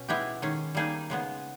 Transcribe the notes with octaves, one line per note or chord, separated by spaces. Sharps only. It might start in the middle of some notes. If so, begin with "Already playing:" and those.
Already playing: B2 C#4
G#3 B3 E4 G4
D#3 G#3 C#4
G3 A#3 D#4 G#4
C#3 G#3 B3